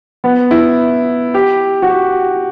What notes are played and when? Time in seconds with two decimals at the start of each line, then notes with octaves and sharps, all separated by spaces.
0.24 B3
0.51 E4
1.34 G4
1.82 F#4
1.89 G4